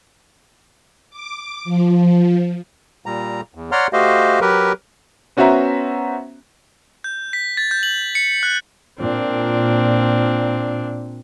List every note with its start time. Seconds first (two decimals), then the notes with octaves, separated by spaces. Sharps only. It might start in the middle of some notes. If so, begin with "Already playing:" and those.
1.10 D6
1.64 F3
3.06 A#2 G3 A#5
3.55 E2
3.72 C#5 D5 F#5 A#5 C6 F6
3.93 A3 F#4 G4 C5 D#5 F5
4.41 F#3 G4 A#4 B4
5.37 B3 C#4 F#4 C5 E5 A#5
7.04 G6
7.33 B6
7.57 A6
7.71 G6
7.83 F#7
8.15 C#7
8.43 F#6
8.99 A#2 C4 D4